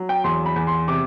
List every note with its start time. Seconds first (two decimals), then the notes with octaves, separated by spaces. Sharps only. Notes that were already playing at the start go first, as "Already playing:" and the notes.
Already playing: F#3
0.09 G5
0.24 E2 C6
0.46 B5
0.56 E2
0.67 C6
0.88 C3 D6